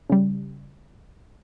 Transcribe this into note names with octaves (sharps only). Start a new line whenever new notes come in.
C#3 G3